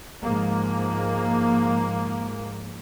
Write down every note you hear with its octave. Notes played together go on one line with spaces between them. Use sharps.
G#2 F3 A#3